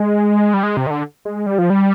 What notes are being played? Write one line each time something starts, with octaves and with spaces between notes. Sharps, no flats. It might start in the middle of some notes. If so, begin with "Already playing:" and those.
Already playing: G#3
G3
G#3
C3
D#3
D3
G#3
G3
F3
G3